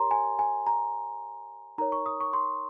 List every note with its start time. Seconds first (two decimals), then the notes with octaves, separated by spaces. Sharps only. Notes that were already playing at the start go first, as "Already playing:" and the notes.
Already playing: G4 A#4 C#5 A#5 C6
0.11 G#5
0.39 G#5
0.67 A#5
1.78 D#4 A#4 C#5 A#5
1.92 C#6
2.06 D#6
2.20 C#6
2.33 C6